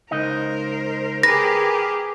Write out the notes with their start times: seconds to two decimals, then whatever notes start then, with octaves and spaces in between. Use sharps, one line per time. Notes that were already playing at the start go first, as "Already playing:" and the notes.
0.11 C#2 D#4 A#4 C5 D#5
1.23 G4 G#4 A#4 B4 A#6